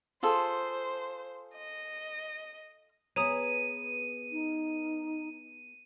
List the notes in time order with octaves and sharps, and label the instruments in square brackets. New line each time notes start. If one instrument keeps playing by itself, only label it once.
[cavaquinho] F4 G#4 A4 [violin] C5
[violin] D#5
[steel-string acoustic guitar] B3 G#4 B4 [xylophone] C#5 A#5 D#6 [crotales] D#7
[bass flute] D#4